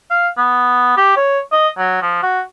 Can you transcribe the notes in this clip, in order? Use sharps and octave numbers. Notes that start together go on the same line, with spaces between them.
F5
B3
G4
C#5
D#5
F#3
F3
F#4